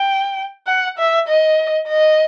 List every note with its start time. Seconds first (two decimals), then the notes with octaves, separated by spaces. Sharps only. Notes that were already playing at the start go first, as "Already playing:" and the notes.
Already playing: G5
0.67 F#5
0.98 E5
1.28 D#5
1.89 D#5